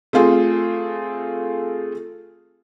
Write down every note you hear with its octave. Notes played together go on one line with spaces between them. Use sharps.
A3 C4 F4 G#4